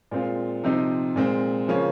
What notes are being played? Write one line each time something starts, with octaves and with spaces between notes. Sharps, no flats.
A#2 G#3 C4 F4
C3 F3 C4 D#4
A#2 G#3 C4
C#3 F3 A#3 C#4